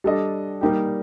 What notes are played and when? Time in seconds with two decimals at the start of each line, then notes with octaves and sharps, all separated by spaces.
0.04 G3 D4 A4 D#5
0.61 G3 A#3 D#4 G4